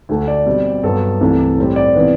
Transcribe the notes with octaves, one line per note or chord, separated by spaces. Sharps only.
D2 D3 A3
D5
B2 G3 C4
G2 F#3 B3 A4
C2 C3 E3 A3
A2 G3 C4
D5
C3 E3 B3